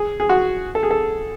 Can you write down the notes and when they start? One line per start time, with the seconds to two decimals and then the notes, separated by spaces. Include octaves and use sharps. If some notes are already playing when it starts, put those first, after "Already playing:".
Already playing: G#4
0.20 G#4
0.29 F#4
0.75 A4
0.83 G#4
0.91 A4